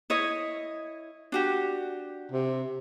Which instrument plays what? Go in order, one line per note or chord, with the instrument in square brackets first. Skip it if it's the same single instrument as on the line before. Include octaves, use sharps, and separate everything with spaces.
[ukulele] E4 C#5 D#5
D4 F#4 G4
[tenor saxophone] C3